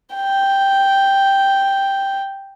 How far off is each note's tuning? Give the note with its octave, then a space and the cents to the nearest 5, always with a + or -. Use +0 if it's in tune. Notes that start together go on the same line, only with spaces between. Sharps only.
G5 +0